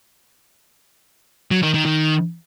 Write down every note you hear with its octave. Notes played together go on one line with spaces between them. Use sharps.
F#3
D#3
D#3
D#3